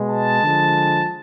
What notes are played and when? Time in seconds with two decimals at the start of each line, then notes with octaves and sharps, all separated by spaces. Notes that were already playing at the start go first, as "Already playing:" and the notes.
Already playing: B2 G#3
0.10 A5
0.43 D3 F3 G#3